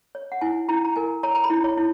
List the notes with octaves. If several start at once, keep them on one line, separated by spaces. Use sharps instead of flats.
C#5
F#5
E4 G#5
E4 A#5
A#5
A#4 G#5
C#5 A#5
A#5
B5
E4
C#5
E4